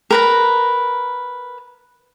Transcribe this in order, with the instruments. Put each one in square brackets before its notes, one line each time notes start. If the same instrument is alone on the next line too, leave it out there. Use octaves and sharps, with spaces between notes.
[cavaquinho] A#4 B4 A#5